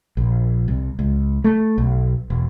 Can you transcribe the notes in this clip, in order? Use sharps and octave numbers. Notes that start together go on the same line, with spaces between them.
A#1
C2
C#2
A3
B1
E1